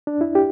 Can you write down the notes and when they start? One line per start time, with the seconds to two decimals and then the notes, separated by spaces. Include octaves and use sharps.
0.07 D4
0.21 E4
0.35 G4